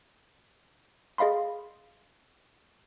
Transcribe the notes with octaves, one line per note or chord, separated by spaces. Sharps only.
G#4 D#5 F5 B5 C6